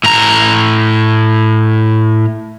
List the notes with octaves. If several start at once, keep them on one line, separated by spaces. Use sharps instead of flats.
A2 A#5